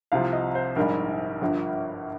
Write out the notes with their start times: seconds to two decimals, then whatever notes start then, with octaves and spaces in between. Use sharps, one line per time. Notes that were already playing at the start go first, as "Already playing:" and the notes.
0.12 C2 C3 F3 F5
0.33 D#5
0.55 C5
0.76 A#1 G#2 G3 A#4
1.41 G1 G2 F3